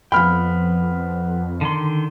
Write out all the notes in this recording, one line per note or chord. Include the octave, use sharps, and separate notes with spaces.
F2 F3 B3 G5 B5 F6
D3 D#3 C6